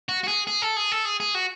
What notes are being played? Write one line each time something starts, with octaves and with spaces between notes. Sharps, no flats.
F#4
F#4
G#4
G#4
A4
G#4
A4
G#4
G#4
F#4